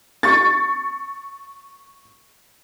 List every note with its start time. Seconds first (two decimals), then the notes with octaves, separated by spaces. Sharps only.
0.23 C#6 A6